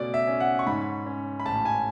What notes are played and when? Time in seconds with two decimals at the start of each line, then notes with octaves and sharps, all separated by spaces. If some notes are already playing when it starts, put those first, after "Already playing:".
Already playing: B2 A3 C#4 D5
0.14 E5
0.27 C#4
0.40 F#5
0.59 C#6
0.67 G#2 B5
1.06 C#4
1.40 B5
1.46 A1 A5
1.65 G#5